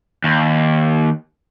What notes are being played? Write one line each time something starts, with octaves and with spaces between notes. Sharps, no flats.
D#2